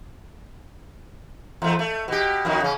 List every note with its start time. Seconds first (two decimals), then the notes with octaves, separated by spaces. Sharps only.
1.62 E2 A3
1.79 A3
2.08 B2 G4
2.45 F2 B2 D#3
2.61 C#3 C#4